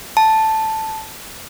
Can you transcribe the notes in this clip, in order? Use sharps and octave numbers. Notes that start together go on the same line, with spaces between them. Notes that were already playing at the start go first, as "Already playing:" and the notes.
A5